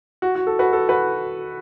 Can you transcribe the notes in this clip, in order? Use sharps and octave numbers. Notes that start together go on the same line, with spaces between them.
F#4
F#4
A4
F#4 B4
A4
F#4 B4